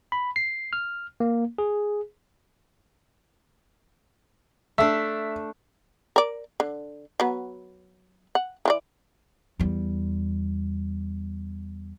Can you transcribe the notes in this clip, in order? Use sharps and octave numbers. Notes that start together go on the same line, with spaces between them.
B5
C7
F6
A#3
G#4
A3 D4 E5
A#4 D5
D3
F#3 B3
F#5
E3 F4 D5
E2 G3